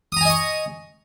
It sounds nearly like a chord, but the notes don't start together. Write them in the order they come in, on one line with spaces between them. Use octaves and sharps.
D#6 A#5 G#5 D#5 C#6